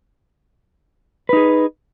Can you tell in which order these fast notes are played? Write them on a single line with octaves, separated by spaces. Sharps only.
B4 D#4 G#4